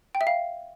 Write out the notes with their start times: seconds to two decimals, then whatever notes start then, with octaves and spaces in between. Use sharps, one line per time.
0.15 G5
0.21 E5
0.27 F5